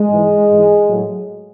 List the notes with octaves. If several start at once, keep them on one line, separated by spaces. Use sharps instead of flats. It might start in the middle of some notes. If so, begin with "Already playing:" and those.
Already playing: G#3
G#2 E3
G#2 E3
A2 F#3